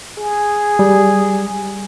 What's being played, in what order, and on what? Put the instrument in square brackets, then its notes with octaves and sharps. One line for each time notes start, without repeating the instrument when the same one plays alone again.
[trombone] G#4
[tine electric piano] G3